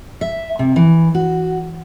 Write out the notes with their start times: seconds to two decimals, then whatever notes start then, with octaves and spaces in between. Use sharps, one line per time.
0.21 E5
0.59 C3
0.76 E3
1.14 F#4